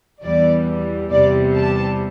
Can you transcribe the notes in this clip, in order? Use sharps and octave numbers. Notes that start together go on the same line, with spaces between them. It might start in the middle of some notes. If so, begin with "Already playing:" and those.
E2 E3 G3 D5
E2 C3 G3 D5
A5